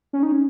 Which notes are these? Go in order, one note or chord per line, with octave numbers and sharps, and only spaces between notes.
C#4
D#4
C#4